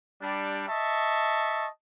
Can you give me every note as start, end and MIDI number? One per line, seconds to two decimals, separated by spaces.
0.22 0.64 55
0.22 0.64 62
0.69 1.66 75
0.69 1.66 76
0.69 1.66 81
0.69 1.66 85